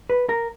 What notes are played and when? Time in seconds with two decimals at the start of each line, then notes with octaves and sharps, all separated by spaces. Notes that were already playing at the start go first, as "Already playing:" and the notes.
0.10 B4
0.29 A#4